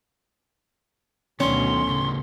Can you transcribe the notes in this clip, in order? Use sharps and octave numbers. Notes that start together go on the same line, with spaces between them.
D2 B2 D#3 F#3 C#4 C6
A2 C#3